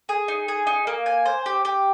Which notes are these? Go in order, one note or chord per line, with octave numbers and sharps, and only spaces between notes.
G#4
D#4
G#4
D#4
A#3
G#5
C5
G4
G4